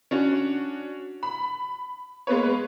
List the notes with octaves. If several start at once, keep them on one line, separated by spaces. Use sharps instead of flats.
C#4 D4 F#4
B5
G#3 A#3 B3 B4 C#5